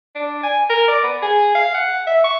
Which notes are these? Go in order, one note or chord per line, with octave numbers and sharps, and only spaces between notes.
D4
G#5
A#4
D5
B3
G#4
F5
F#5
E5
C#6